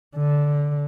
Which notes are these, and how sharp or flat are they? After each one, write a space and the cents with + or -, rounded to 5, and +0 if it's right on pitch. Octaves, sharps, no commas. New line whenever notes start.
D3 -10